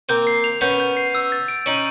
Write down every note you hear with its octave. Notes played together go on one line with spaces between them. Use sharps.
A#3 C4 G6
C7
F7
B3 C#4 G6
G6
C7
E6
A6
D7
C#4 D#4 F#7